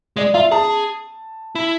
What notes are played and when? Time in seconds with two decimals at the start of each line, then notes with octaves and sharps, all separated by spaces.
0.16 G#3 D5
0.34 F4 E5
0.51 G#4 A5
1.55 E4